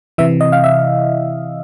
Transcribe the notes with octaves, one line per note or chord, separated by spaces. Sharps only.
C3 E3 E5
D#5
F5
E5